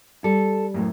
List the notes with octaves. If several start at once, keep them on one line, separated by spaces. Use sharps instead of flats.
G3 A4
F#2 A2